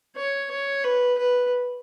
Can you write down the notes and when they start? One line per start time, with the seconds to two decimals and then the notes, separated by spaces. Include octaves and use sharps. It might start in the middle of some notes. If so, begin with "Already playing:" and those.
0.16 C#5
0.51 C#5
0.84 B4
1.18 B4